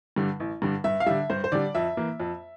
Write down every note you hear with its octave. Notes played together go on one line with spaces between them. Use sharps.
G2 D3 G3
A1
G2 D3 G3
G2 E5
F5
D3 G3 E5
G2 C5
C5
D3 G3 D5
F2 E5
E3 A#3
F2